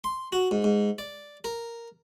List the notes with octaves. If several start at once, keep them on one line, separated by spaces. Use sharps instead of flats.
C6
F#4
G#2
G#2
D5
A#4